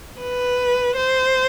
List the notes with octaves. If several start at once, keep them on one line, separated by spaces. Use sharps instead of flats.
B4
C5